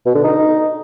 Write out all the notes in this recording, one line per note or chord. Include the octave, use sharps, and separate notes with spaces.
B2
D3
D#4